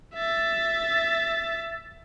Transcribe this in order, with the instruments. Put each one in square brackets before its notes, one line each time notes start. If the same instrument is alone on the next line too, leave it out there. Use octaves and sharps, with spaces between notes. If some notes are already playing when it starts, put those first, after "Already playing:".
[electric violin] E5 A6